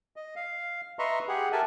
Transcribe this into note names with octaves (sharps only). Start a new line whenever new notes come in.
D#5
F5
B4 D#5 E5 A#5 C6 C#6
G4 G#4 F#5
G4 A4 A#4 E5 G#5 A5